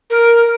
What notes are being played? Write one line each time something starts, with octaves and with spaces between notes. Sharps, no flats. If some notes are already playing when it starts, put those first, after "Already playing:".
A#4